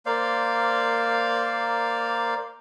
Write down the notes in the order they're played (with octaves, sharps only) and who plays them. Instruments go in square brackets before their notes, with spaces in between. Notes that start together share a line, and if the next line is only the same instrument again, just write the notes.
[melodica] A#3 C5 D5 F5